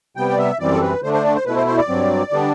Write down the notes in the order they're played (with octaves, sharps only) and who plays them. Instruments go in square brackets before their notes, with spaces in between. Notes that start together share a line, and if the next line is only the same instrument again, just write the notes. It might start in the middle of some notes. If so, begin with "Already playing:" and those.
[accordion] C3 G3 B3 G5
D5
E5
F#2 E3 G3 C4 D5
A4
B4
D3 A3 D4 C5
C5
D5
C5
B2 A3 E4 B4
C5
C5
D5
G2 F#3 C4
D3 G3 B3 D4